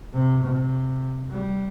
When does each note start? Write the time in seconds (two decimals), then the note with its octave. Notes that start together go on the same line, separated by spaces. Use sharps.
0.13 C3
0.42 C3
1.29 G3